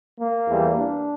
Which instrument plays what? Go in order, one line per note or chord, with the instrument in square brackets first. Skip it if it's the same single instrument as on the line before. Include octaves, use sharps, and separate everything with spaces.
[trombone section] A#3
E2 E3 G3
D4